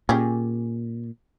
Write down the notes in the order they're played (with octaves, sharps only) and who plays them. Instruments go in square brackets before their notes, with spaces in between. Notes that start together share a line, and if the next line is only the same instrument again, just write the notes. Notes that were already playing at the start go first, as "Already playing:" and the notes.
[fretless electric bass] A#2 [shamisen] C#4 G4 G#4